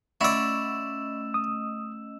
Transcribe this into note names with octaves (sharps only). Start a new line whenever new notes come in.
A3 C#4 E4 D5 D#5 C#6 E6 E7
D#6